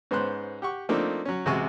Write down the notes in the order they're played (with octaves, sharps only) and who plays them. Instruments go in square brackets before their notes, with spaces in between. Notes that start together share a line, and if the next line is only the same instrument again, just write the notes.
[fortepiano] G#2 B3 C#4 C5 C6 F#6
G4 F#5 C#6
F3 A3 A#3 C4 D4 D#4
F#3 C#4
A1 C3 G#3 F#4 G#5 C#6